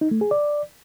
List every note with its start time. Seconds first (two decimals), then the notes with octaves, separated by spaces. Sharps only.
0.01 D#4
0.11 A3
0.21 G#4
0.31 D5